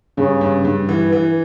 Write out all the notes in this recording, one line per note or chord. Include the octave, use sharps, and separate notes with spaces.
G2 C#3
G2
G2
E3
E3